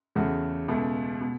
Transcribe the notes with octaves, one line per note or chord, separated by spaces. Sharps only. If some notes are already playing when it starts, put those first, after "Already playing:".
E2 C#3 A3 F#4
C#2 B2 A3
B2